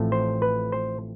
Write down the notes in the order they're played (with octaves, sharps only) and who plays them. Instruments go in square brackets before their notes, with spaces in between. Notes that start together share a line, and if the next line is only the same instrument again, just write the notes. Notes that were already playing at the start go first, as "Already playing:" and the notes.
Already playing: [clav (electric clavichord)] A1 A2 F3 A3 C4
C5
B4
C5